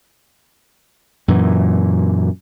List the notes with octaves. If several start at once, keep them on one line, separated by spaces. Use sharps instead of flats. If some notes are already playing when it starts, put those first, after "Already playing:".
F#2 A#2 E3